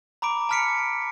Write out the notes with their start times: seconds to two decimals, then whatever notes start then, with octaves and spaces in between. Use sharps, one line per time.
0.22 A#5 B5 D6 D7
0.49 A5 B5 F6 B6 C#7 D7